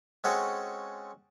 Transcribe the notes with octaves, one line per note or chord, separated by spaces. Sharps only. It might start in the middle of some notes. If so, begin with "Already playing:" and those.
G#3 C4 C#4 F#4 G#4 A4